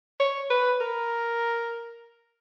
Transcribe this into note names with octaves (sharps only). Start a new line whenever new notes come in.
C#5
B4
A#4